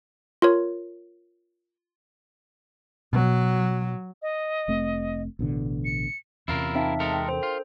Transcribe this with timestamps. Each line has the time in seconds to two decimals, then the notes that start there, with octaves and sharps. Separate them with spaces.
0.42 F4 A#4 C#5
3.13 B2 F#3
4.22 D#5
4.68 F1 A3 C4
5.39 A1 B2 D3
5.85 C#7
6.48 E2 C3 C#4 E4 F4 A#4 C7
6.75 C4 D#4 E5 F5 A5
7.00 G#3 A4 A#4
7.14 G5 C6
7.29 D4 A4 A#4 C5
7.43 F4